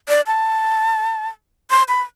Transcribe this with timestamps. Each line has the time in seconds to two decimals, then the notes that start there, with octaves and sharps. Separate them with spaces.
0.09 D5
0.27 A5
1.71 C6
1.88 B5